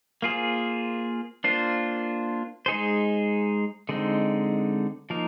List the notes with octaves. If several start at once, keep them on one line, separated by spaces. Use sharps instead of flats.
A#3 F4 G#4 C5
A#3 D4 F4 C5
G#3 D#4 G#4 C5
D3 G#3 C4 D#4
F3 A#3 D#4 A#4